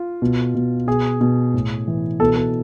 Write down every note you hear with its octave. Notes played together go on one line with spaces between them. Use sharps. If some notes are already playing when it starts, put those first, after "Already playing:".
Already playing: F4
B2
B2
B2 G#4
B2
A2
E3
B2 A4
A4